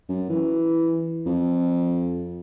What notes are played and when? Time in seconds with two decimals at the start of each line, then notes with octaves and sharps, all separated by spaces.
0.09 F#2
0.29 E3
1.26 F2